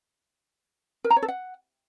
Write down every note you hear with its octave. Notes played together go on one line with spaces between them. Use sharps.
A#4
A#5
C#5
A4
F#5